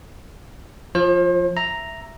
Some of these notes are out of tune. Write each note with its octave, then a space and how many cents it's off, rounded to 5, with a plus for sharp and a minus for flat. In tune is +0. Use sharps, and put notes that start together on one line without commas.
F3 +0 C5 +40
E5 +0 A#5 +0